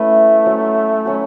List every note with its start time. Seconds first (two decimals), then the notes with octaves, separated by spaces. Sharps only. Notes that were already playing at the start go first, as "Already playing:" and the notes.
Already playing: A3 C#4 E4 B4 E5
0.46 F#3 C#4 F#4
1.05 F#3 C#4 F#4